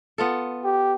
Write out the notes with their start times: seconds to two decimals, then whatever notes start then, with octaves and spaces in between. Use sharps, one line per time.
0.18 B3 F4 A4
0.64 G4